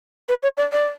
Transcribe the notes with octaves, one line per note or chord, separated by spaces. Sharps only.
B4
C#5
D5
D5